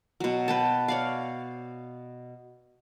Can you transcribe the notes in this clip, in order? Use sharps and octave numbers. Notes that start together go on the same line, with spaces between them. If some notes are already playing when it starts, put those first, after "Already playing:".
B2 F#3
B4 G5 A5
C#5 D5 F5